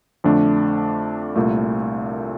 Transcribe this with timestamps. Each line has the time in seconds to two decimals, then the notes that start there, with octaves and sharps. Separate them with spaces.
0.24 F2 D3 A3 D4
1.36 C2 A#2 A3